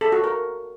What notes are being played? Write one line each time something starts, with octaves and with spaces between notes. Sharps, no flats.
A4
F#4
A#4